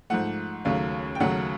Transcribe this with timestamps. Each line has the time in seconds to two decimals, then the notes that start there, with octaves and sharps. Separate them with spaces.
0.10 G#2 F3 A3 F#5
0.65 D#2 C#3 F#3 A3 F5
1.15 G5
1.20 D#2 C#3 F#3 A3 F#5